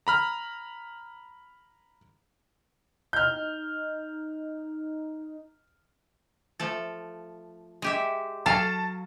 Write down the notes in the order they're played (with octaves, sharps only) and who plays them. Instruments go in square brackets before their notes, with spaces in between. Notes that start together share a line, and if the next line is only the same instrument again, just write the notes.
[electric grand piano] A#5 B5 F6
[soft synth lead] D#4 [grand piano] F6 G6
[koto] F3 A3 A4
G#3 G4 E5
[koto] F#3 A4 F5 [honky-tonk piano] A5